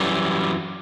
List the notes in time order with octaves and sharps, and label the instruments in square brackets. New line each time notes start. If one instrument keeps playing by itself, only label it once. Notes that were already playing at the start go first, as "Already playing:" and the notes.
Already playing: [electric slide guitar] F#2 E3 G3